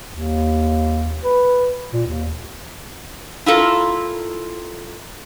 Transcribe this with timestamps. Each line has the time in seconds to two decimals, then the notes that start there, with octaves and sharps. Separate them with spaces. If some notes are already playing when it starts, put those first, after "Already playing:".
0.11 D#2
1.24 B4
1.93 A#2
2.06 D#2
3.46 E4 F4 A4 A#4